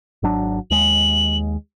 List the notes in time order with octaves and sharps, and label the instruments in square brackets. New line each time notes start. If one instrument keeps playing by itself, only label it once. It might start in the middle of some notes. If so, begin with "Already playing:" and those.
[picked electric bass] G#1 F#3 D4
[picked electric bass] D#2 G#3 [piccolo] F#7